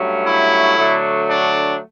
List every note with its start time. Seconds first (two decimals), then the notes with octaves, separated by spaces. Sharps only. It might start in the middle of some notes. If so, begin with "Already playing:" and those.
Already playing: G2 F#3 A3 C#4
0.26 E4
0.78 D3 F#3 A3 D4
1.28 D4